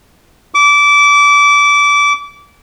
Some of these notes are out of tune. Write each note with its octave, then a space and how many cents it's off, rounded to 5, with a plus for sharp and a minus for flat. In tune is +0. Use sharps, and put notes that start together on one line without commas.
D6 -25